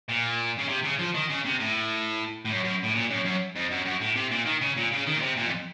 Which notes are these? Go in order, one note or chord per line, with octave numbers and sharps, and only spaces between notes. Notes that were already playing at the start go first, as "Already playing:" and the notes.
A#2
C#3
C3
C#3
F3
D#3
C#3
C3
A2
A2
F#2
F#2
A2
A#2
F#2
F#2
F2
F#2
F#2
A2
C3
A#2
D#3
C#3
A#2
C#3
D#3
A#2
C3
A#2
F2